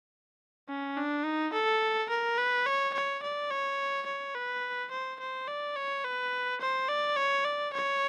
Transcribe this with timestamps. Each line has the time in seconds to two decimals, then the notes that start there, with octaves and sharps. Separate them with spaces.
0.69 C#4
0.97 D4
1.25 D#4
1.53 A4
2.10 A#4
2.38 B4
2.66 C#5
2.94 C#5
3.23 D5
3.51 C#5
4.07 C#5
4.35 B4
4.91 C5
5.20 C5
5.48 D5
5.76 C#5
6.04 B4
6.61 C5
6.89 D5
7.16 C#5
7.45 D5
7.73 C#5